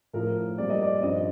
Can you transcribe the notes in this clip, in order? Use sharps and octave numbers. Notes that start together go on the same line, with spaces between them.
A2 F3 A3 A#4
A#2 G3 C4 D5
D#5
D5
G2 F3 C4 D#5